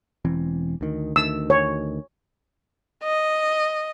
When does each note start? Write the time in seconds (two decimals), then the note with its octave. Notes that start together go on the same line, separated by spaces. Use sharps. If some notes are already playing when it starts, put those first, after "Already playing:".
0.25 E1 E3 C4
0.81 D2 D#3
1.16 D2 D#3 E6
1.50 C#5
3.03 D#5